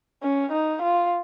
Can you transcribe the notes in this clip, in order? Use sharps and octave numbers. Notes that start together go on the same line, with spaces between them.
C#4
D#4
F4